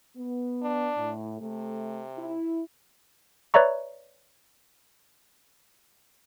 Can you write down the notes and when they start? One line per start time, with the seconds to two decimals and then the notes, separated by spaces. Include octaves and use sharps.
0.17 B3
0.63 D4
0.97 A2
1.40 C3 A3
2.18 E4
3.54 B4 C#5 D5 E5 A#5 C#6